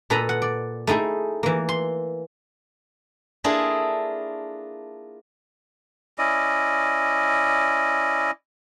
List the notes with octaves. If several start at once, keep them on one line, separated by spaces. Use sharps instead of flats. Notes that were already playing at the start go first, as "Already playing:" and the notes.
A#2 A4 B4 D#5 A#5 B5
F#5
D5
A3 D#4 E4 G#4
E3 A#3
C6
A#3 D4 E4 F4 G#4 A4
C#4 E4 D5 D#5